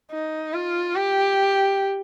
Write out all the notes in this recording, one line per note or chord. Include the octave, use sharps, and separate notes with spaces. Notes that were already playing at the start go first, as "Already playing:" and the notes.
D#4
F4
G4